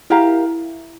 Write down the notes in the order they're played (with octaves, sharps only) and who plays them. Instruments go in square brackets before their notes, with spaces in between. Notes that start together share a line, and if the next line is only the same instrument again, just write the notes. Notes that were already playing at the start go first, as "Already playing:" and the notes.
[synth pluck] E4 [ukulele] G4 A#4 F5 A#5